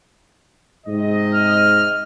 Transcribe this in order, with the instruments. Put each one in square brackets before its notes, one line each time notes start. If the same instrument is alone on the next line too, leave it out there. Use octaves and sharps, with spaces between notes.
[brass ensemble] G#2 C3 D#5
[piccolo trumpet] F6